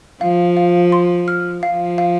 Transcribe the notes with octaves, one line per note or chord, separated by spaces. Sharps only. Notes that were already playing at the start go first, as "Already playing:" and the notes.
F3 F5
F5
C6
F6
F3 F5
F5